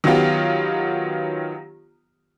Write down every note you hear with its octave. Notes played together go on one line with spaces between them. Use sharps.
D#3 F#3 B3 F4 G4